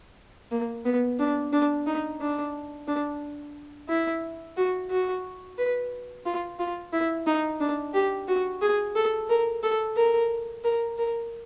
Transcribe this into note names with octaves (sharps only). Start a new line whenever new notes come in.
A#3
B3
D4
D4
D#4
D4
D4
E4
F#4
F#4
B4
F4
F4
E4
D#4
D4
G4
F#4
G#4
A4
A#4
A4
A#4
A#4
A#4